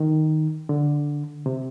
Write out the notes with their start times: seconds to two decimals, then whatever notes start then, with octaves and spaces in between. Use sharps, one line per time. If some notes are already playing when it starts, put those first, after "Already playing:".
Already playing: D#3
0.69 D3
1.46 C3